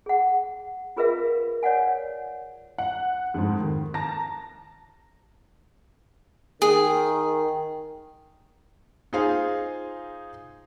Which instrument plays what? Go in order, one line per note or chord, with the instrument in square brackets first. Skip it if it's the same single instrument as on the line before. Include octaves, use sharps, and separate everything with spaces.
[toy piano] G#4 F#5
F4 G#4 A#4 B4 E5 F5
C#5 D5 F5 F#5 G#5
[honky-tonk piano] F#5
F2 G#2
D#3
A5 A#5 A#6
[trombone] D#3 [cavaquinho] G#4
[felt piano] D#4 F4 G#4 C5 F5 G#5